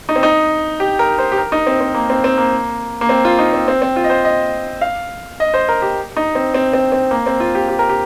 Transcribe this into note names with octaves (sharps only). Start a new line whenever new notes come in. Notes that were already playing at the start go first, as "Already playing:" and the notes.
D#4
C4
D#4
G4
A#4
C5
G4
A#4
D#4
C4
C4
A#3
C4
C4
A#3
A#3
C4
F4
D#4
C4
C4
C4
F4
D#5
C5
D#5
F5
D#5
C5
A#4
G4
D#4
C4
C4
C4
C4
A#3
C4
F4
G4
G4
A#4
G4